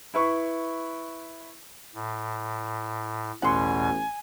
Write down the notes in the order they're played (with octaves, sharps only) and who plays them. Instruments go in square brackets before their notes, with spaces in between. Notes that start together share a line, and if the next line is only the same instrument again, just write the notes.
[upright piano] E4 B4 C#6
[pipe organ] A2
[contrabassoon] A1 [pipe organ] E2 B2 [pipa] F#5 C6 [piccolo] G#5